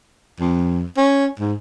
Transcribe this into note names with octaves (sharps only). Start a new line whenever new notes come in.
F2
C#4
G#2